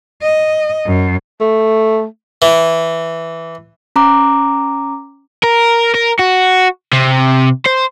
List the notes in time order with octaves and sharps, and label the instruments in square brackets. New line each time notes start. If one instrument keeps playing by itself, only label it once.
[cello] D#5
F#2
[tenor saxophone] A3
[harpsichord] E3
[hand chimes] C#4 A#5 D6
[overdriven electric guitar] A#4
A#4
F#4
C3
C5